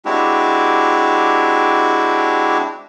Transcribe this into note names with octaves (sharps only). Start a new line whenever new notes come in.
G#3 C4 D4 E4 F#4 G4